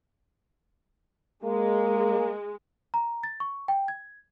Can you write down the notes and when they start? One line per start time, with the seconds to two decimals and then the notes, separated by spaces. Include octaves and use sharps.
1.44 G#3 A#3
2.94 A#5
3.23 A6
3.40 C#6
3.68 G5
3.88 G#6